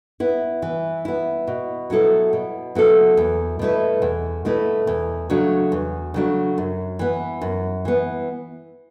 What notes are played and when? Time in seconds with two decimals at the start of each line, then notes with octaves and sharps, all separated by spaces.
0.20 B3 E4
0.62 E3
1.05 B3 E4
1.47 B2
1.90 F#3 B3 E4 A4
2.33 B2
2.75 F#3 B3 E4 A4
3.17 E2
3.59 B2 A3 E4 B4
4.02 E2
4.45 B2 A3 E4 B4
4.87 E2
5.30 C#3 F#3 A3 D4
5.72 E2
6.14 C#3 F#3 A3 D4
6.58 F#2
6.99 E3 B3
7.41 F#2
7.85 E3 B3